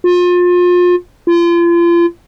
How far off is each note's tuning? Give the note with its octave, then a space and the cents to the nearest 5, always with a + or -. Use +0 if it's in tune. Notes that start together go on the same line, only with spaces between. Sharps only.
F4 +30
F4 -35